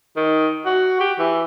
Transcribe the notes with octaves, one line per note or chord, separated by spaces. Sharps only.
D#3
F#4
G4
E3